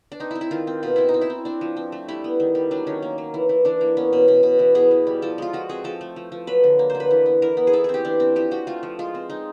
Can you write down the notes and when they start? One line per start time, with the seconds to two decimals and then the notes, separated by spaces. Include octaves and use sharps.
0.12 D4
0.20 C4 D#4
0.31 C4 E4
0.41 E4
0.51 D#3 F4
0.67 C4
0.83 B2 F4
0.96 C4 E4
1.09 D#4
1.14 C4
1.21 E4
1.30 C4
1.45 C4 D4
1.61 F3
1.77 C4
1.92 A3
2.08 G3 E4
2.24 B3
2.40 D#3
2.55 G3
2.71 F#3 D4
2.87 D#3 C#4
3.02 A#3
3.18 F#3
3.34 E3
3.49 E3
3.65 E3 D4
3.81 A#3
3.97 B3 C#4
4.13 B2
4.28 B2
4.43 B2
4.59 E3
4.75 B3 G#4
4.91 E3
5.07 G3
5.22 F3 A4
5.38 G#3 F4
5.53 F3 F#4
5.69 C4 G#4
5.84 F3 A4
6.01 A3
6.16 F3
6.32 F3
6.47 F#3 B4
6.64 D3
6.79 A#3
6.90 C5
6.95 D3
7.00 B4
7.11 E3
7.26 B3
7.42 E3 A#4
7.57 B3
7.67 G#4
7.73 E3 A4
7.84 C4 G#4
7.94 G4
8.05 E3 D4
8.20 C4
8.36 F3 G4
8.51 C4 F#4
8.67 A3 F4
8.83 F3
8.99 G#3 F4
9.15 C4
9.30 G#3 D#4